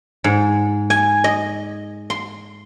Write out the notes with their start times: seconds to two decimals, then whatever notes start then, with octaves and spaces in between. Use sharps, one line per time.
0.24 G#2
0.90 G#5
1.24 D#5
2.10 C6